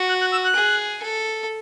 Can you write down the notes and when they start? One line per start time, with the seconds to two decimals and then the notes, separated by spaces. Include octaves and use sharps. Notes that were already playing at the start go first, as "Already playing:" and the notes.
Already playing: F#4
0.09 F#6
0.21 F#6
0.32 E6
0.44 F#6
0.56 G#4
1.03 A4